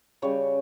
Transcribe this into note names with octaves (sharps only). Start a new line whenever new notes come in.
C#3 G3 C#5